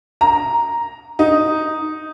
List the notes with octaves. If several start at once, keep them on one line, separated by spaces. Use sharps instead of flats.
A#5
D#4